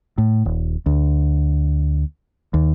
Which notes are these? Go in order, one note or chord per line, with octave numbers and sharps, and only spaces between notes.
A2
D#1
D2
D#2